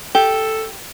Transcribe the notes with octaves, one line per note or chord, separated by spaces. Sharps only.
G4 A4